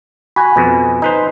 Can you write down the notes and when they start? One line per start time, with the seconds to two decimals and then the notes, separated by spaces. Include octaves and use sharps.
0.36 F#4 G#5 B5
0.56 F2 B2
1.02 D#4 B4 C5